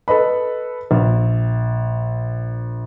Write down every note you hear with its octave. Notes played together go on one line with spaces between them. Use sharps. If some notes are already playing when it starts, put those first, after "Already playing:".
A4 B4 D#5 B5
A#1